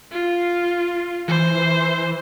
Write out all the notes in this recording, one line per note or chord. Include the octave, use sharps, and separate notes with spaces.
F4
E3 C5